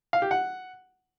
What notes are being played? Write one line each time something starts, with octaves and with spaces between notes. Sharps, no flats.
F5
G4
F#5